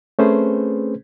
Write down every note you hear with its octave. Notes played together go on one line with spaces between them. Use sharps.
A3 C4 C#4 G#4 B4 C5